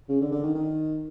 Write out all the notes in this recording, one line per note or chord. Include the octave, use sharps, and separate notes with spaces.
C#3
D3
D3
D#3
D#3